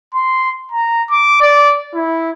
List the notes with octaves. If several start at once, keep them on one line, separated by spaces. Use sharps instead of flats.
C6
A#5
D6
D5
E4